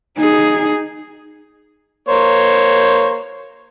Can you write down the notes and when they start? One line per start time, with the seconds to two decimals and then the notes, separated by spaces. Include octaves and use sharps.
0.18 D#4 G#4
2.08 A#3 C5 C#5